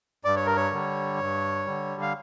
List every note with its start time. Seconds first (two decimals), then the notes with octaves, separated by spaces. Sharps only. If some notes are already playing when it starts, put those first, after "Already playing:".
0.25 G2 D5
0.36 C#5
0.46 A#4
0.56 C#5
0.72 D3 G3
1.19 G2
1.66 D3 G3
2.02 F5